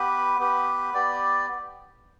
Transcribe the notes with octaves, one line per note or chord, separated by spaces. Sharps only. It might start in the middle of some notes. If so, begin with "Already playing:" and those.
Already playing: B3 G4 B4
B3 G4 B4
B3 G4 D5